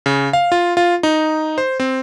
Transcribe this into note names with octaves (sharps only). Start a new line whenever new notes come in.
C#3
F5
F4
F4
D#4
C5
C4